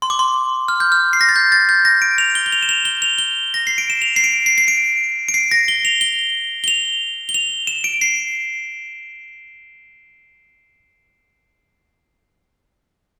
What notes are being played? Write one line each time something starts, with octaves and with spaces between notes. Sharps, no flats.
C6
D6
C6
F6
G6
F6
C7
A#6
A6
G6
A6
G6
A#6
D7
F7
G7
G7
F7
E7
F7
G7
F7
G7
A#6
C7
D7
E7
F7
C7
D7
C7
C7
D7
D7
C7
A#6
G7
F7
G7
G7
F7
G7
F7
E7
D7
C7